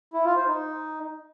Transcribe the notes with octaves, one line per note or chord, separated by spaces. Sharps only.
E4
F4
C5
D#4